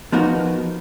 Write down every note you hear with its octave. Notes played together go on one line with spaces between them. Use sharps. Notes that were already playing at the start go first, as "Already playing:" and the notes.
F3 B3 D#4 F#4 A#4